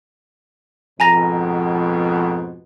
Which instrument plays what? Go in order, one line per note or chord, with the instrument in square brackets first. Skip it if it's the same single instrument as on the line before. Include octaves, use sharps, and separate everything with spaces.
[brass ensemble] F2 G#2 B2 [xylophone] G#5 A#5 A#6